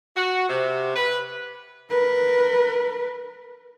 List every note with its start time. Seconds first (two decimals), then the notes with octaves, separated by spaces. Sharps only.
0.16 F#4
0.49 C3
0.95 B4
1.90 A#4 B4